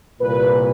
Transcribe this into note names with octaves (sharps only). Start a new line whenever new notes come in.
C2 A#2 B4